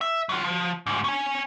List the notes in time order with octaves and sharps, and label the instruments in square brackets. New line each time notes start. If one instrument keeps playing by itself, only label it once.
[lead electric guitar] E5
F#3 F4
F3
D2 G#2
C#4 G#5